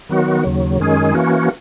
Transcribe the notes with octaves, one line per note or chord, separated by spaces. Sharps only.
D#3 F#3 B3 F#4
D#2 C#3 F#3
F#2 D#3 G#3 C#4 G#4
E3 A#3 C#4 F#4